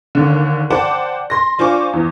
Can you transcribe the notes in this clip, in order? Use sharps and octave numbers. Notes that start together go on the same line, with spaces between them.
D#2 D3
C5 D5 F#5 G5 A5 D6
C6 A#6
D4 F4 C5 G#5 C#6 D6
E2